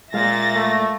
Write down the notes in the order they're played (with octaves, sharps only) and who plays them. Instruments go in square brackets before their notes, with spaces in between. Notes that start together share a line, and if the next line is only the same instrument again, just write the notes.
[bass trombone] A#2 [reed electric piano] G#3 F5 [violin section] E5 A6 A#6
[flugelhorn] A3